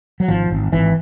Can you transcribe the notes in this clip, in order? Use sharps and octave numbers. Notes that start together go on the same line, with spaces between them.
F#3
G#1 F3
G#1
G#1 E3